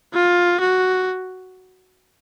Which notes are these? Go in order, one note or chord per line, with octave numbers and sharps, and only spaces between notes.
F4
F#4